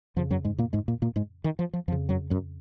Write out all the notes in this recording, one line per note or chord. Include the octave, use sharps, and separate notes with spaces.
F2 C#3 F3
F#2 F#3
G#2 G#3
A#2 A#3
G#2 G#3
A#2 A#3
A#2 A#3
G#2 G#3
D#3
F3
F3
F2 C#3 F3
F#2 F#3
F#2 F#3